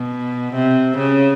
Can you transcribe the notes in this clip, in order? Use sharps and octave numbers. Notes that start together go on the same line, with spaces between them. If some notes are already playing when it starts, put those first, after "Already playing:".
Already playing: B2
C3
C#3